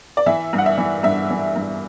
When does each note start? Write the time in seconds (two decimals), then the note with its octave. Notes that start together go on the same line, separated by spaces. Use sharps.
0.17 D5
0.26 E3 E5
0.53 G2
0.58 F#5
0.66 E5
0.78 E3
1.03 G2 E5
1.30 E3
1.56 G2